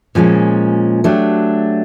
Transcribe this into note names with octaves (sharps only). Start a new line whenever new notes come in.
A#2 F3 G#3 C#4
F#3 A3 D4 G4